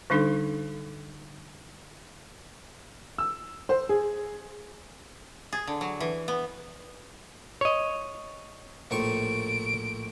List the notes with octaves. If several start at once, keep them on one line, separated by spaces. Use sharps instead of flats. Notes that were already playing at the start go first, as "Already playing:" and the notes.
D3 G3 D4 D#4 A4
E6
C5
G#4
G#4
D3
F#3
E3
B3
C#5 D#5
A#1 A2 C#6 D7